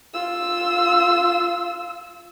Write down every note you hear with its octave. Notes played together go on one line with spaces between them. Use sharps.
F4 E6